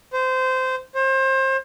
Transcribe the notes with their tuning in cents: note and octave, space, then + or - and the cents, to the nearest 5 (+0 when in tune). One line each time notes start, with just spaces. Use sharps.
C5 -20
C5 +30